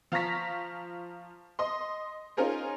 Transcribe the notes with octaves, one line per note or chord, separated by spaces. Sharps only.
F3 F5 A#5 C#6 A#6 B6
D#5 C6
C#4 D#4 F4 G#4 A#4 C5